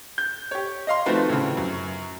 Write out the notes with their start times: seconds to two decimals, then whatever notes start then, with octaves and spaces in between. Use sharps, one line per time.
0.18 G6
0.51 G4 C#5
0.87 D#5 F5 C6
1.06 D#3 F3 A3 C4 F#4 B4
1.29 A2 C#3
1.57 F#2